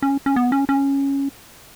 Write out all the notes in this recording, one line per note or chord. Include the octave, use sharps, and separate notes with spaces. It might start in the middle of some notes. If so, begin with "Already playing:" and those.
C#4
C#4
B3
C#4
C#4